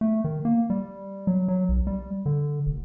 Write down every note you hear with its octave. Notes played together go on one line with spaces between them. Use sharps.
A3
D#3
A#3
G3
F#3
F#3
B1
G3
D3
F1